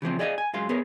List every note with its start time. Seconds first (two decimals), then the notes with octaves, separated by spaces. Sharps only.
0.02 C#3 E3 F3 C4
0.19 G#4 D5 D#5 F5 F#5 G#5
0.38 G#5
0.54 F#2 G#3 F5 C6
0.69 B3 G#4 A#4 C#5